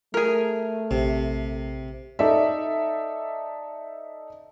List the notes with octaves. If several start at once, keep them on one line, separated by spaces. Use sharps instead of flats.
A3 G#4 A#4
A#1 C3
D#4 A4 D5 E5